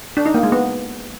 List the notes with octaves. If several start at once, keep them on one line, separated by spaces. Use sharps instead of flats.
D4
D#4
A#3
G#3
B3